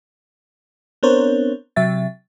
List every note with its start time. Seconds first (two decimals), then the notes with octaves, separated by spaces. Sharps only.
1.03 B3 C4 D4 A#4 C5 C#5
1.76 C3 F#3 E5 A6